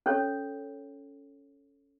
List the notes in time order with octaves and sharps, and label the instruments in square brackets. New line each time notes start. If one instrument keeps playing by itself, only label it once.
[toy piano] C#4 A4 C#5